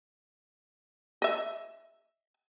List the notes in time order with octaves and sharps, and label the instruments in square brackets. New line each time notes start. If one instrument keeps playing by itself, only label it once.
[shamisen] D#5 E5